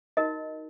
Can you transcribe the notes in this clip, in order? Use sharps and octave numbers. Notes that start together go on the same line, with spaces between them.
D#4 F#4 A#4 D#5